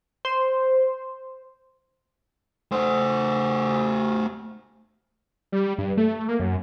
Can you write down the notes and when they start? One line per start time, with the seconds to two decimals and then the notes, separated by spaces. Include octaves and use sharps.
0.25 C5
2.72 A3 C5
5.52 G3
5.78 G2
5.97 A3
6.28 A#3
6.40 F#2